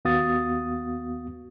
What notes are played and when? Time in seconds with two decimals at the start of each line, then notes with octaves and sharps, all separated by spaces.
0.05 D#2 B3 F#4 F5 D#6 A6